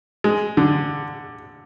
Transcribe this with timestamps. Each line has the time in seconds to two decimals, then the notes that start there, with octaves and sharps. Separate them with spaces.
0.24 G#3
0.57 D3